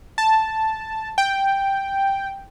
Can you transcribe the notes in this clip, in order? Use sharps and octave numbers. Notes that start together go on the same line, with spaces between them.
A5
G5